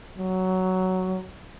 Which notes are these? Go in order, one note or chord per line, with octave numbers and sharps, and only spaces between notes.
F#3